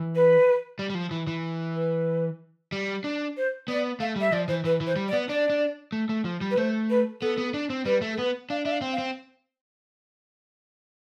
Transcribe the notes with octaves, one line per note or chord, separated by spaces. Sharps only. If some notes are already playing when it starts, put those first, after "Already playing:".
Already playing: E3
B4
G3
G3
F3
E3
E3
B4
G3
D4
C5
B3 D5
A3 F5
G3 E5
F3 D5
E3 C5
E3 B4
E3
C5
G3
D5
B3
D4 D5
D4
A3
A3
F3
G3
B4
A3 C5
B4
B3 A4
B3
D4
C4
G3 B4
A3
A4
B3 B4
D4 F5
D4 E5
F5
C4
F5
C4